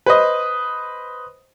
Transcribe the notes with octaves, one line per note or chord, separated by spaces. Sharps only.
B4 C5 D#5